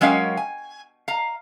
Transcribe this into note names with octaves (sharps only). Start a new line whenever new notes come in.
F#3 G#3 C#4 A#4 F5 G5
G#5
F5 A#5